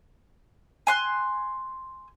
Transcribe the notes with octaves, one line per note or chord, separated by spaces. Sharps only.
G#5 C6 F#6